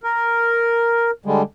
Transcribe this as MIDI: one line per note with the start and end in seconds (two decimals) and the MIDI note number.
0.03 1.11 70
1.26 1.42 50
1.26 1.42 55
1.26 1.42 56